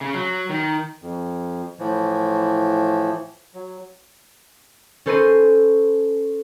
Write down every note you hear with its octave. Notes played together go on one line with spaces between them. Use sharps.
C#3
F#3
D#3
F2
A2 E3 F3
F#3
C#4 A4 C5 B5 A#6 D#7